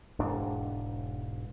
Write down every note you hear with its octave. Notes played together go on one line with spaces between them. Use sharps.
E1 G#2 D4